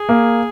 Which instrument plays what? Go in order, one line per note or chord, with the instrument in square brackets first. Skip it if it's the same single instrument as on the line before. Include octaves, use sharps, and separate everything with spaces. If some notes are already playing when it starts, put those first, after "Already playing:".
Already playing: [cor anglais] G#4
[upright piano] A#3